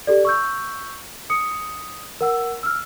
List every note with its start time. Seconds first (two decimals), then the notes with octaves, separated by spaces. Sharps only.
0.07 G4 A4 D5
0.25 C#6 E6 G6
1.30 D#6 C#7
2.21 A#4 F#5 E6
2.63 E6 F6